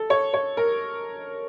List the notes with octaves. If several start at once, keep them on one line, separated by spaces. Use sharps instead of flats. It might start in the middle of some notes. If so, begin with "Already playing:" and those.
Already playing: A4
C#5
C#5
A#4